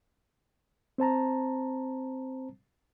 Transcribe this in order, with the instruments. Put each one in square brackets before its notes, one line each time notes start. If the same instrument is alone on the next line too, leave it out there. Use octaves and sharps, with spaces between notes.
[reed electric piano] C4 C5 A5 A#5